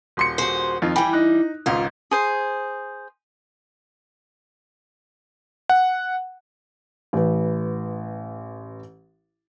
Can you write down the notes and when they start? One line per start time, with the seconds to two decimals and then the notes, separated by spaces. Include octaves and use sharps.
0.17 D#1 C6 C#7
0.38 F#4 G#4 C5
0.82 F2 D#3 F4
0.96 E3 G3 G5 G#5 B5
1.13 D#4 F#6
1.66 G#1 C#2 G#2 F4
2.11 G#4 C5
5.69 F#5
7.13 A1 B4